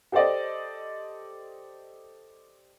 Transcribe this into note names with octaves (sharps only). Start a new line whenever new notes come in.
G4 A4 C5 D5 D#5